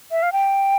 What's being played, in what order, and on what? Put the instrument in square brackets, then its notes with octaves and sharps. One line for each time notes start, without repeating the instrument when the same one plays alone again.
[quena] E5
F5
G5